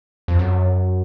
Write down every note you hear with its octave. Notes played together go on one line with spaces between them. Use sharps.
F2
F#2